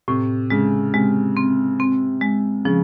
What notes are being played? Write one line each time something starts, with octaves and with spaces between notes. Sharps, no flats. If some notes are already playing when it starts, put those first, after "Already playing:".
A2 C3
C#3 G#3
C3 G#3
C4
C4
G#3
C#3 F3